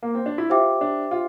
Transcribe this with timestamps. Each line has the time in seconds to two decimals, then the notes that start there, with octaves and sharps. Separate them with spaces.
0.03 A#3
0.15 C4
0.26 D4
0.38 E4
0.50 F4 G4 C5 E5 G5 D6
0.81 D4
1.11 F4